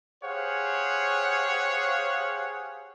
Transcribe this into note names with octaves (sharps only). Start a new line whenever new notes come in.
G4 G#4 C5 C#5 F5 F#5